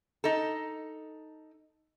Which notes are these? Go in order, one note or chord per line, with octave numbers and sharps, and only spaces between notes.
D#4 A4